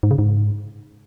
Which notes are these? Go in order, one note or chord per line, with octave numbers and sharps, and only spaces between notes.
G#2
C#3
G#2